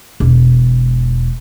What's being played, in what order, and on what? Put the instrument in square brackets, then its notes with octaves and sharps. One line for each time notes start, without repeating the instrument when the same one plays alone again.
[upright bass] E1 G#3